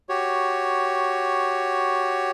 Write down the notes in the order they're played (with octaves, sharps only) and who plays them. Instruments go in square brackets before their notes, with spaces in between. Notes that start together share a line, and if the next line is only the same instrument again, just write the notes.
[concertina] F#4 G4 C#5